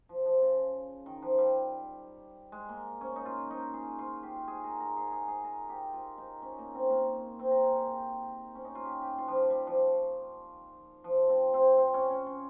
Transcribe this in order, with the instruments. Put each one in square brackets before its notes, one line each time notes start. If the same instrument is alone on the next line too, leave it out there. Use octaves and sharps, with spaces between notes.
[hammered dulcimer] F3
F3
C#3
D#3
F3
G3
G#3
A#3
C#4
D#4
F4
D#4
G#4
F4
G4
G#4
A#4
A#4
G#4
G#4 A#4
G#4
A#4
G4
F4
D#4
C#4
A#3
C4
A#3
C4
A#4
G#4
G4
C#4
D#4
F4
G4
G4
F4
F3
G3
G3
F3
F3
C4
C4
C4
C#4
C#4
F4